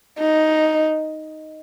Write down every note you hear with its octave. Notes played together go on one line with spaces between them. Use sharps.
D#4